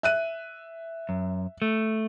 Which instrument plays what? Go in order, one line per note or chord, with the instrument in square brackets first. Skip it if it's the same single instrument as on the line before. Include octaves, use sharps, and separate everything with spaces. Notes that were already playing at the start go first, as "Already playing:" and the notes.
[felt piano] E5 F#6 D#7
[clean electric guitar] F#2
A3